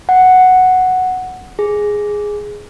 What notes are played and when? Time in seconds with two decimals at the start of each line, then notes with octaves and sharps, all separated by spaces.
0.09 F#5
1.59 G#4